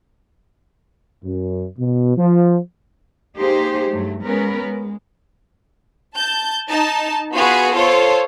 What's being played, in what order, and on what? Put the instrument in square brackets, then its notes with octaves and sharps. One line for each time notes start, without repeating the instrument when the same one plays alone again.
[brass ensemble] F#2
B2
F3
[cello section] A#3 D#4 G4 G#4 C5
G2 F#3 A3
G#3 B3 C#4 A#4 B4
G#3
[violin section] A5 G6
D#4 A5
B3 F4 F#4 G#4 B4
F4 A4 C5 C#5